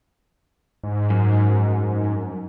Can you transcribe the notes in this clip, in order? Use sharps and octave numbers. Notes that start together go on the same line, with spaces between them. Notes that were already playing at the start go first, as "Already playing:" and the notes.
G#2
F#2